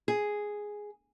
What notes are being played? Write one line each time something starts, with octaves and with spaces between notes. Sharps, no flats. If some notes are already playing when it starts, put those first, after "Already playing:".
G#4